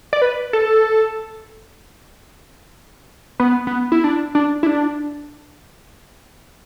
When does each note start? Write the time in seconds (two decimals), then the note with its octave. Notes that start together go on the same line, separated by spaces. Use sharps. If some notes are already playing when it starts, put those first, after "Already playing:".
0.13 D5
0.22 B4
0.53 A4
3.40 B3
3.67 B3
3.92 E4
4.04 D4
4.35 D4
4.63 E4
4.67 D4